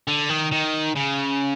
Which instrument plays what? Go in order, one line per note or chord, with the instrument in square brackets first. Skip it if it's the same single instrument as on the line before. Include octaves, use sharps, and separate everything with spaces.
[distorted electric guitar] D3
D#3
D#3
C#3